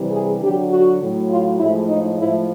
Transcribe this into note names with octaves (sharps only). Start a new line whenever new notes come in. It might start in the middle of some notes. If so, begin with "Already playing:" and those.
Already playing: C3 E3 G3
G#4
D3 F#3 G4
F#4
A2 F#3
F4
A2 F3 G#3 E4
D#4
A2 F3 G#3 E4